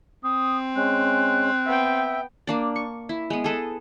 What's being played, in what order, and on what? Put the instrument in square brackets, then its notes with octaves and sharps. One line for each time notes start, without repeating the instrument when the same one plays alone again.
[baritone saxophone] C4 [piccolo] D#6
[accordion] G#3 C#4 [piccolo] F#6
[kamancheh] B3 G5 [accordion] E5
[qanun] A#3 D4 D5
C#6
E4
G#3 B3
G#4 A4 B4